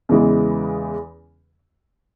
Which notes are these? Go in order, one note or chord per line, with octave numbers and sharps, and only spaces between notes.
E2 C#3 E3 G#3